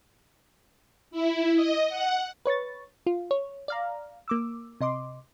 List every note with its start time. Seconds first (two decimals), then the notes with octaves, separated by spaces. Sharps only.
1.11 E4
1.55 D#5
1.89 F#5
2.45 B4 C#5 C#6 A6
3.06 F4
3.31 C#5
3.68 D5 F5 A#5
4.28 A#3 D6 E6
4.81 C3 D#5 C6 D6